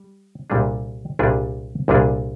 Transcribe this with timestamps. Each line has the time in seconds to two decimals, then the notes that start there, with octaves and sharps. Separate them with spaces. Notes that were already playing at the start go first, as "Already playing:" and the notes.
Already playing: G3
0.50 C2 A#2 G3 D4 G#4
1.19 C2 A#2 G3 D4 G#4
1.88 C2 A#2 G3 D4 G#4